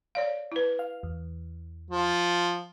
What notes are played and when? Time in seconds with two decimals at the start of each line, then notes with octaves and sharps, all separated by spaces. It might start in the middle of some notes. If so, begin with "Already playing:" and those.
0.15 C#5 D5 F5
0.52 E4 B4
0.79 F5
1.03 E2
1.91 F3